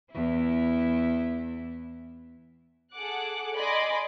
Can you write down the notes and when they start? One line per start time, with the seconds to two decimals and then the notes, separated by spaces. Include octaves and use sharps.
0.12 E2 E4
2.94 G#4 A4 F#5 D6 F#6
3.55 D5 D#5 G#5 B5 C6 D6